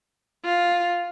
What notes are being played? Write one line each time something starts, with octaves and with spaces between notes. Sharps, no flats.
F4